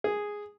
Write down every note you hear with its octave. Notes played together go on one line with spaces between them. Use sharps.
G#4